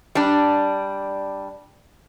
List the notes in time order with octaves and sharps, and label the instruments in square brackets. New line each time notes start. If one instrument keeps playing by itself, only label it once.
[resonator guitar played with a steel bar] G3 D4